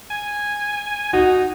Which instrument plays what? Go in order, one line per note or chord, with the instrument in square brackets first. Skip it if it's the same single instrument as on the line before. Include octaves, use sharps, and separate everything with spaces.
[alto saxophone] G#5
[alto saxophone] D#4 [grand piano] F#4